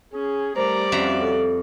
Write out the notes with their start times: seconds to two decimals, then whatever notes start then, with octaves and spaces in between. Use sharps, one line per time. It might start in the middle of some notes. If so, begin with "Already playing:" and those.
0.13 C#4 G#4
0.56 G3 A3 A#4 C5 D5 A#5
0.92 F2 C#4 F#4 E5 A#5
1.21 A4